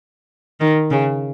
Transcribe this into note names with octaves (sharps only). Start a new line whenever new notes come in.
D#3
C#3